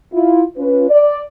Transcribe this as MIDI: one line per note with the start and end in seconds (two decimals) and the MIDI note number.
0.12 0.42 64
0.12 0.42 65
0.56 0.88 61
0.56 0.88 65
0.56 0.88 71
0.89 1.22 74